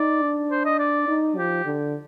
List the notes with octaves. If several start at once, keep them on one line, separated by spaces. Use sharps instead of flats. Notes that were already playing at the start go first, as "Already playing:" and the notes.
Already playing: D#4 D5
D4
C5
D#5
D5
D#4
F3 G4
D3